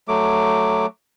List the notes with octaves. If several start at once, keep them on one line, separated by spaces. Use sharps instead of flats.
F#3 A3 D6